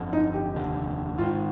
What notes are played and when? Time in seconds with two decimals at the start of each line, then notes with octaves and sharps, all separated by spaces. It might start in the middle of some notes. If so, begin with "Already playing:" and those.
Already playing: G1 F2 D3
0.13 D#4
0.34 G4
0.55 F1 D#2 D3
1.18 G#1 G#2 D#3 F4